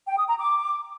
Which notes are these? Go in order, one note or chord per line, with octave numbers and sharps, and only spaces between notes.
G5
D#6
A#5
D6